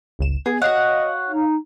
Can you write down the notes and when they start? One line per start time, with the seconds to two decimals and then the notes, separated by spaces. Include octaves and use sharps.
0.19 G1 C#2 E7
0.46 B3 G#4
0.62 F#4 C#5 D#5 F5 F#5
1.29 D#4